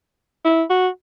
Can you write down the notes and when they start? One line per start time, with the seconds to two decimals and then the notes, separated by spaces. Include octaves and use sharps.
0.45 E4
0.70 F#4